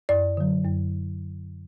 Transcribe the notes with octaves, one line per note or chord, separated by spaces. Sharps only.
F#2 D5
D3 F#3
F#2